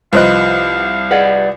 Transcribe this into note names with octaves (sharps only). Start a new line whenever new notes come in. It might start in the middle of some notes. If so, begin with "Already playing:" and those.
C2 F3 B4 C5 D#5 F5 F#6
G#4 B4 D5 D#5 F#5